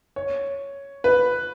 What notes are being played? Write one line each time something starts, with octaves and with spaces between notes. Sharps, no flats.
C#5
B4